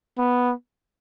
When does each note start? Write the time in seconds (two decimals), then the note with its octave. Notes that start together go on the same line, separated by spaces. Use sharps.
0.18 B3